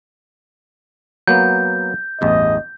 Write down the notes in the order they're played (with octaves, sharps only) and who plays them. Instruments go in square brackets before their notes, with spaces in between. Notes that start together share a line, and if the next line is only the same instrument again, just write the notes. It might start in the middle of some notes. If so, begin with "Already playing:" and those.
[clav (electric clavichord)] F#3 A#3 B3 [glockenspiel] G6
[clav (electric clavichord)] A1 E2 G2 [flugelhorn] D#5